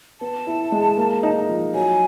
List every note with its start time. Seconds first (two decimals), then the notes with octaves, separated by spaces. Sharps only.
0.21 B3 A5
0.47 E4
0.72 G#3
0.97 A#3
1.23 D#4
1.49 F3
1.74 F#3 G#5